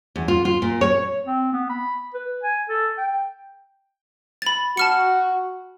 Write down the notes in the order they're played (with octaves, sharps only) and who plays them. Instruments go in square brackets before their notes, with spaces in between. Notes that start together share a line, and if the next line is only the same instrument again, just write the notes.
[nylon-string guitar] E2
F4
F4
A#2
C#5
[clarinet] C4
B3
B5
B4
G#5
A4
G5
[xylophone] B5 A6
[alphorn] F#4 [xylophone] A5 F6 C#7